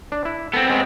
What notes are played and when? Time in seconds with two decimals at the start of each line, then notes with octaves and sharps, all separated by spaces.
0.12 D4
0.25 E4
0.53 B3 C4 A4
0.70 G#3 C#4